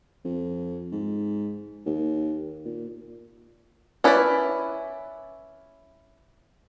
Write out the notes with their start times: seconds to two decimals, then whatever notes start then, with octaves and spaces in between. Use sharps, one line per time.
0.25 F2
0.92 G#2
1.86 D#2
2.65 A#2
4.04 C#4 E4 B4 C5 D5